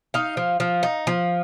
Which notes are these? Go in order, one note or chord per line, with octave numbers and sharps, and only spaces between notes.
D#4 F5
F3
F3
D#4
F3